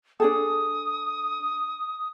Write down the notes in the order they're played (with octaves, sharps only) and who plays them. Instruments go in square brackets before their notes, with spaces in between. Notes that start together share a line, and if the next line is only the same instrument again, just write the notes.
[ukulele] D4 G#4 A4 [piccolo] D#6